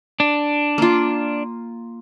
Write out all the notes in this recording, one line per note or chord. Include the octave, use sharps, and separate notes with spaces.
D4
A#3 F4